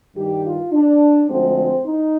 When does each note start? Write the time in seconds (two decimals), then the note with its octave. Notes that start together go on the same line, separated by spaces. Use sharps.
0.15 G2 D#3 G3 G4
0.44 F4
0.72 D4
1.29 D2 D3 F3 G#3 C4
1.86 D#4